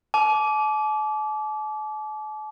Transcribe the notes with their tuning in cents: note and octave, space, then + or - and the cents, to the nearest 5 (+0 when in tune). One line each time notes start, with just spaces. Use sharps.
A5 -45 D6 -15